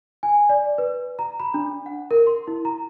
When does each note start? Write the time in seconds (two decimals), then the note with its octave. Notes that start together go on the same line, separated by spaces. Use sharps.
0.23 G#5
0.49 D5
0.78 B4
1.19 A#5
1.40 B5
1.54 D4
1.86 F#5
2.11 A#4
2.27 C6
2.47 E4
2.65 A#5